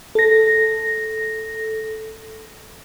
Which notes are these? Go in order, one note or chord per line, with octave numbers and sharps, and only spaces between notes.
A4 A#6